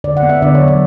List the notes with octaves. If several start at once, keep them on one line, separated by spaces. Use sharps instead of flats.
D3 D5
F#5
B3
E5
D3 D5
C#5
F#3
D5